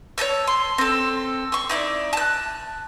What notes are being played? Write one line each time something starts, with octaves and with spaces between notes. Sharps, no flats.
C#5 D#5 A5 E6
C6
C4 A4
C6 C#6
D#4 E4 C5 D5
A5 F#6